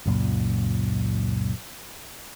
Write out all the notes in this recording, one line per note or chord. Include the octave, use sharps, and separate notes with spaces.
C#2 F#2 A#2